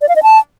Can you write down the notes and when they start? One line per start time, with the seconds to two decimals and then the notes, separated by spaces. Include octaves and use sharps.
0.02 D5
0.09 F5
0.16 D#5
0.23 A5